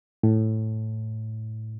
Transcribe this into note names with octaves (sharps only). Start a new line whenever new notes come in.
A2